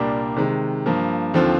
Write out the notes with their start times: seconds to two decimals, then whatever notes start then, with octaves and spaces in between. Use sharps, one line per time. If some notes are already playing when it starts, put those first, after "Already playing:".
Already playing: C2 A#2 G3 A#3 D4
0.37 C3 D#3 G#3
0.86 G2 F3 A#3
1.34 D#2 D3 F3 C4 F4